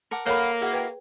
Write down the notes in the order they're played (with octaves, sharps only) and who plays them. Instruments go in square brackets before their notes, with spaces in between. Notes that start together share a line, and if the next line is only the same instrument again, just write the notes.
[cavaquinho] A#4 F#5 D6 [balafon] A5
[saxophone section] A#3 [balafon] A4 A#4 C#5 [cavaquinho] F#5 B5
[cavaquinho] E4 F#4 [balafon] G#4
[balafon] B4 G5